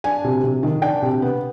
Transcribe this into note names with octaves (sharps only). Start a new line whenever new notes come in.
D4 G#5
C3
C3
D#3
D4 G5
C3
B3